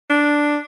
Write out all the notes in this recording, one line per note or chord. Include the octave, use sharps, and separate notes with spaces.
D4